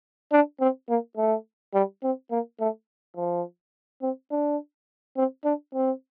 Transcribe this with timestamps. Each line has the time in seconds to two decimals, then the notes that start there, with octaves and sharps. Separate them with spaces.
0.32 D4
0.60 C4
0.89 A#3
1.17 A3
1.74 G3
2.03 C4
2.31 A#3
2.60 A3
3.16 F3
4.02 C4
4.31 D4
5.16 C4
5.44 D4
5.74 C4